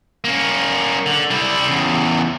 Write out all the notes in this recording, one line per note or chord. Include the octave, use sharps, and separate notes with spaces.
A#3 C#4
D3
G3 E4
E2 C#3